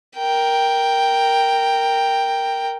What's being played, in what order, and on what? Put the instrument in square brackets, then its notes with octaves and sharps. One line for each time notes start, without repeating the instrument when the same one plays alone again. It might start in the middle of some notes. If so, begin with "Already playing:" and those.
[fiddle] A#4 G5